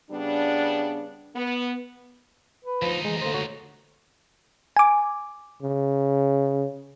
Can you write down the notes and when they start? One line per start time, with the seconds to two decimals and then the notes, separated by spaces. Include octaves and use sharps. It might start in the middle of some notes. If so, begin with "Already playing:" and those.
0.11 C#3 G3 B3 D4
1.36 B3
2.65 B4
2.82 D2 F3 D#4
3.05 E3 G#3
3.22 D3 A#3 C5
3.34 F#4 C#5
4.77 G#5 D6
5.62 C#3